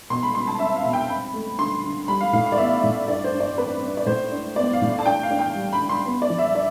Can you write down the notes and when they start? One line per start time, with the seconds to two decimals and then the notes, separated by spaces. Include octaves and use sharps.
0.10 B2 C6
0.23 B5
0.34 B2 C6
0.47 A5
0.59 C4 E5
0.76 F5
0.84 B2
0.93 G5
1.10 C4 B5
1.34 A3
1.58 D3 C6
1.84 D3
2.08 G3 B5
2.21 F5
2.33 A2 F5
2.46 F5
2.52 D5
2.58 B3 E5
2.83 A2
3.08 G2 D5
3.24 C5
3.33 G2
3.40 D5
3.57 C4 B4
3.82 C4
3.97 D5
4.06 A2 C5
4.32 D4
4.56 B3 D5
4.73 F5
4.82 A2
4.89 F5
4.99 A5
5.06 D4 G5
5.23 F5
5.31 D4
5.39 G5
5.55 G3
5.73 B5
5.81 D3
5.89 C6
6.05 B3
6.22 D5
6.30 F3
6.38 E5
6.55 D5